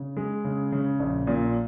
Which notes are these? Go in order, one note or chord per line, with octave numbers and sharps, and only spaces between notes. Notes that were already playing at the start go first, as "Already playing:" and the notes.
Already playing: C#3
G#3
C#3
C#3
A#1
A#2